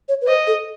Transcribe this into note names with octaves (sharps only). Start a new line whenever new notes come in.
C#5
B4
C5 D#5
A4